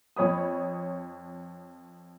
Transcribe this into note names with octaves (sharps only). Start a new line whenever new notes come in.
F2 C#5 B5 D#6